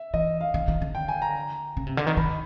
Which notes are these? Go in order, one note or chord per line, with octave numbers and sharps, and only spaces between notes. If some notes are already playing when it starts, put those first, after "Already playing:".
Already playing: E5
E3 D#5
F5
D#3
D#3
D3
G5
G#5
A#5
C#3
C3
D3
D#3
D#3 B5